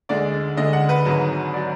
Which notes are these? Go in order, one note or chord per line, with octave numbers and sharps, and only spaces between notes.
D2 D3 G#3 D5
D2 D3 G#3 D#5
F#5
B4
G#1 G#2 F#3
F#3 D5